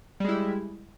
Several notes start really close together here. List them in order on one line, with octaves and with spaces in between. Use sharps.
G3 G#3 E4